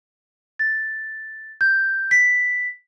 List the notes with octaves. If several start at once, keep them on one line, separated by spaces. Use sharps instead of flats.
A6
G6
B6